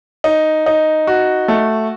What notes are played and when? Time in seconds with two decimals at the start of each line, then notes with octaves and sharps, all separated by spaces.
0.24 D#4
0.66 D#4
1.07 F#4
1.48 A3